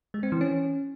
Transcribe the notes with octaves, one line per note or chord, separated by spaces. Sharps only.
G#3
C4
E3
C#4